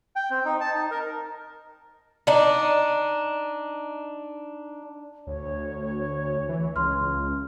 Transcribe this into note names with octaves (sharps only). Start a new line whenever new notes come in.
G5
C4
D#4
A5
D#4
A#4
D4 D#4
D2 C#5
E3
C#2 C6 F6